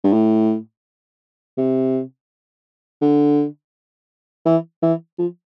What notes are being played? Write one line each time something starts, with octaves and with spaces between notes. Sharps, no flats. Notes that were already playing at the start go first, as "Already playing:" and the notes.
G2
A2
C3
D3
E3
E3
F3